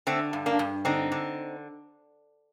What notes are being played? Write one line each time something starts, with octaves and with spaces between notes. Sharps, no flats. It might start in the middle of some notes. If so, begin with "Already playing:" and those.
D3 A3 C4
G2
A#3 D4
G2
D3 C4 D#4
D3